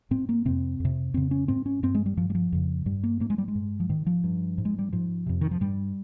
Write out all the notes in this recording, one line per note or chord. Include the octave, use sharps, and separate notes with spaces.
G#2 C4
A#3
F2 C3 C4
F2 C3
F2 C#3 C4
C#4
G#2 C4
C#4
G2 C4
G#3
G3
G2 F3
G3
F3
F2 C#3
G2 G3
A#3
G#2 A#3
G#3
G3
G#3
G2
F3
G#2 D#3
F3
G2
G#2
G#3
G3
G#2 F3
F2 C3
D#3
F3
G2 G3